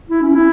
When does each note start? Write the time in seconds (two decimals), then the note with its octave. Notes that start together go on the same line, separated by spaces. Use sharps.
0.10 E4
0.22 C#4
0.35 E4